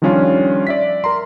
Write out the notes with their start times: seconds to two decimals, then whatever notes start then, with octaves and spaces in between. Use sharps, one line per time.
0.02 D#3 F3 G3 C#4 D4 F4
0.67 D5 E5 B6
1.04 A#4 A#5 C6